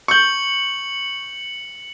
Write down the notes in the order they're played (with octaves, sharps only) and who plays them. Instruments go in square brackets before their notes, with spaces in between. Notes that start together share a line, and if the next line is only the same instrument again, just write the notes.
[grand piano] C#6 G6 [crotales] C#7 F#7